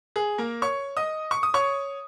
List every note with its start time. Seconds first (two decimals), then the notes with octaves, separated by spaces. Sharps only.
0.16 G#4
0.38 A#3 A#4
0.62 C#5 C#6
0.97 D#5 D#6
1.31 C#6
1.43 D#6
1.54 C#5 C#6